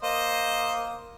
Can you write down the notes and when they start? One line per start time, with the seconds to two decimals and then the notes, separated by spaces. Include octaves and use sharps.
0.03 A#3 C5 D#5